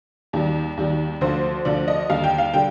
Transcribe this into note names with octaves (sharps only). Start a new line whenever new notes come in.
D#2 D#3 G3
D#2 D#3 G3
D2 D3 F3 C5
D2 D3 F3 D5
D#5
D#2 D3 G3 F5
G5
F5
D3 G3 G5